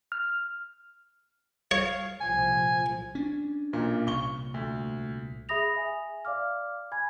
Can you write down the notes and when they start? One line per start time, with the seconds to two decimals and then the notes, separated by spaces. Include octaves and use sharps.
0.12 F6
1.71 C#5 F5
2.21 C2 A#2 F3 G#5
3.15 C#4 D4
3.73 B1 A#2
4.07 C2 A#2 C#6 G7
4.54 D2
5.49 G#4 E5 B5 D#6 A#6 F7
5.76 E5 G#5
6.25 D5 F5 D6 F6
6.92 G#5 B5 G#6